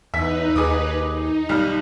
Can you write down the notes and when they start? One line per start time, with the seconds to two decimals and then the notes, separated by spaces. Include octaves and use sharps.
0.14 E2 D#4 B4 E5 B6
0.56 D#2 G#4 D6 D#6
1.12 D#4
1.49 B1 G3 F6